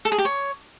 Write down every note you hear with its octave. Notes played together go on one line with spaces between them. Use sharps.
A4
G#4
G4
C#5